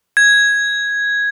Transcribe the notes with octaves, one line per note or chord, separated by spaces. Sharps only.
G#6